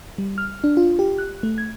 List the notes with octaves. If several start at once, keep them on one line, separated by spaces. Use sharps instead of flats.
G3
F6
D4
F4
G4
F#6
A3
G#6